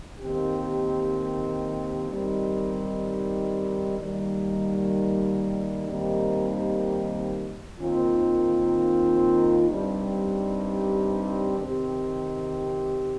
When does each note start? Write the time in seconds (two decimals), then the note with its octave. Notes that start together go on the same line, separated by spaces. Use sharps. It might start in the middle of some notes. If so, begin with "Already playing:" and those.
0.20 D#2 D#3 C4 G4
2.09 D#3 G3 C4 D#4 G4
3.99 D#2 D#3 G3
5.88 D#2 D#3 G3 C4 G4
7.78 D#2 D#3 C4 F4
9.67 G2 G3 C4 D#4 G4
11.58 C3 D#3 C4 G4